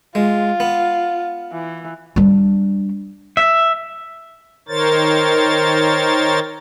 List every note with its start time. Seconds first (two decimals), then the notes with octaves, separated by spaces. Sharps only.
0.15 G#3 F4
0.60 B3
1.53 E3
2.16 G3 D4
3.37 E5
4.68 D#3 A#4 C5 C#5 A6